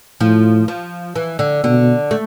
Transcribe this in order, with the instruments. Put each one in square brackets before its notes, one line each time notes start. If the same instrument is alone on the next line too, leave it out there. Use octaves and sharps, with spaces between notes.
[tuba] A2 [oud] F3
[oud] F3
E3
D3
[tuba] B2 [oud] D3
[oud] A3